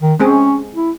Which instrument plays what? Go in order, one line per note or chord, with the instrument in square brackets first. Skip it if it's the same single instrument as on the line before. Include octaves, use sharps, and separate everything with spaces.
[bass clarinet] D#3
[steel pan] G#3 C4 G#4 [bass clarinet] C#4
[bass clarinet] E4